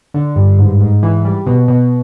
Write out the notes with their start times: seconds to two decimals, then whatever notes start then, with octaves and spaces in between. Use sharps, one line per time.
0.14 D3
0.36 G2
0.58 G#2
0.80 G#2
1.03 E3
1.25 G3
1.46 B2
1.68 B2